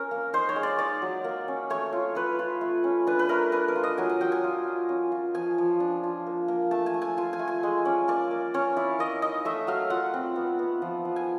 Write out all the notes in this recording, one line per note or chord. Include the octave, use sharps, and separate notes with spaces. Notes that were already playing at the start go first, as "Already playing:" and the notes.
Already playing: C#4 A#4
A#3
D#4 C5
C#5
G#3
D5
D#4 D5
F#3
A#3
C#4
A3 C#5
F4
F4 B4
F4
A3
C#4
D4 B4
B4
A3 A#4
D4 B4
A#4
F4
D#5
F#3 G#5
G#5
F#3 G5
G#5
F4
F4
C#4
F4
F3 G#5
F3
D4
F4
A#3
A#3
A3 A5
G#5
A3
G#5
F4 G#5
G#5
A3
G#5
G#3
C#4 D5
A#3 D5
A#3
C#4 C#5
E4 D5
A#3 D#5
D#4 D#5
A3 E5
F#3 F5
F4 F#5
C4
B3
B3
F3
F3
G#5